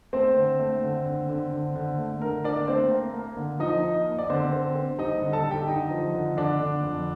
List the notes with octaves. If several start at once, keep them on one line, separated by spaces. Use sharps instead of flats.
A3 C4 C5
D3
A3
D3
D3
D3
D3
D3
A3
D3 A#4
D4 D5
A3 C4 C5
A#3
A#3
D3
F3 D#4 D#5
D#4
A#3
D5
D3 C4 C5
C4
C4
G3 D#4 D#5
D3
A4 A5
D#4
G4 G5
D3 D#4 D#5
F3
D3
D3 D4 D5
D3
F2